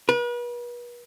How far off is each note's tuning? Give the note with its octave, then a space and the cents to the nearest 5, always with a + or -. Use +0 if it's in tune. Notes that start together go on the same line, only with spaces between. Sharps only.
B4 -40